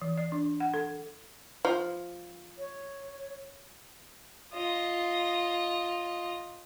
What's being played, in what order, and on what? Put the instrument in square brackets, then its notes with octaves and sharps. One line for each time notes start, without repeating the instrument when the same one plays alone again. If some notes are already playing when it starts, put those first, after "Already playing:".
[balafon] E3
D5
D4
F#5
A4
[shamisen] F3
[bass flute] C#5
[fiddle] F4 D#5